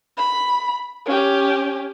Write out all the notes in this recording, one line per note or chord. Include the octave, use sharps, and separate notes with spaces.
B5
C#4 G4